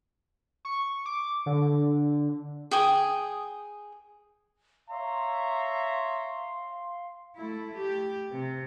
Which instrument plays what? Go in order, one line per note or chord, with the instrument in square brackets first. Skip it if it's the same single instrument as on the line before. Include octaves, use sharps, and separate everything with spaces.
[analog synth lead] C#6
D6
D3
[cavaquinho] G#4 G5 D#6
[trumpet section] C#5 E5 A#5 [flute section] F5 C6
[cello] A3 E4
G4
C3